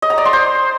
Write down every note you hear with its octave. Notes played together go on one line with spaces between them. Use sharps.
D#5
A#5
D5
C6
C5